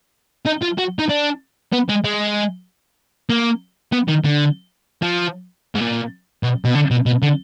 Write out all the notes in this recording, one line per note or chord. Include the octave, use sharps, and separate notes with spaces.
D#4
F4
F#4
D#4
D4
B3
G#3
G#3
A#3
B3
D#3
D3
F3
G#2
A#2
B2
B2
D3
B2
B2
D3